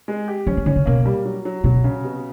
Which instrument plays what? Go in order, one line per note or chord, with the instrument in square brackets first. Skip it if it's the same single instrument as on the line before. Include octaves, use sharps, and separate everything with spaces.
[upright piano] G#3
G4
[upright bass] F3 [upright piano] C#4
[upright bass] E3
[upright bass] D#3 [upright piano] C#4
[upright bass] C#3
[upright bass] B2 [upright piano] A#3
[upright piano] G3
F#3
F#3
[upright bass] B2 [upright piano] F#3
[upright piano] C#3
B2